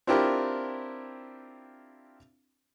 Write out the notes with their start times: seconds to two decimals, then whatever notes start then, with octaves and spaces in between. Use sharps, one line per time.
0.07 C4 D4 E4 F4 G4 A#4